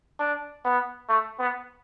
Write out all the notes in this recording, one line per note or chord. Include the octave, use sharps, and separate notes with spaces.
D4
B3
A3
B3